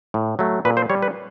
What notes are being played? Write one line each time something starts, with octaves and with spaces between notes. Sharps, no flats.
A2
F#3 A3
A#2 B4
C5
G3 C#5
B4